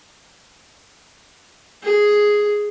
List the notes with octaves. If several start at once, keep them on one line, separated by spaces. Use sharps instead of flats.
G#4